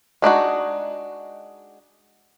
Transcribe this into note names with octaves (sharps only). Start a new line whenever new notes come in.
G#3 D4 D#4 F#4